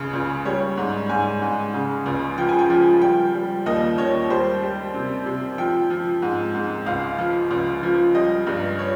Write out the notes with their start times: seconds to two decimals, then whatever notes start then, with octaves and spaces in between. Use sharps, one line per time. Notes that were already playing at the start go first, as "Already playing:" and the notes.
Already playing: C#2 C#3
0.13 C#2
0.45 G3 C#5
0.77 G#2
1.09 G#2 G#5
1.42 G#2
1.74 C#3
2.06 C#2
2.38 F3 G5
2.49 G#5
2.59 G5
2.70 F3
3.02 G3 G5
3.34 G3
3.66 D#2 D#5
3.98 D#2 C#5
4.30 G3 C5
4.62 G3
4.94 C3
5.26 C3
5.58 F3 G5
5.90 F3
6.22 G#2
6.54 G#2
6.86 C#2 F5
7.18 F3
7.51 C#2
7.83 F3
8.15 G3 D#5
8.47 G2
8.79 C#5